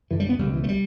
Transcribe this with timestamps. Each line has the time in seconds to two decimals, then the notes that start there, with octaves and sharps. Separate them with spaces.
0.10 F#2 D3 E3
0.20 G3
0.29 B3
0.39 C#2 B2 G3
0.53 E3
0.64 A3
0.69 G3